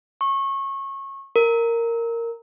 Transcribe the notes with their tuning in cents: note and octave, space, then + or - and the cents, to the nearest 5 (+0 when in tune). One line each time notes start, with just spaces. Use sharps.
C#6 -25
A#4 -10